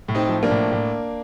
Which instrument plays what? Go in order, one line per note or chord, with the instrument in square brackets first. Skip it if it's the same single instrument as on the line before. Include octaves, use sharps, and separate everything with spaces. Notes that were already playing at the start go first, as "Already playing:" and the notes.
[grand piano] A2
C4 D#4
F3
A#3 D4
A2
A2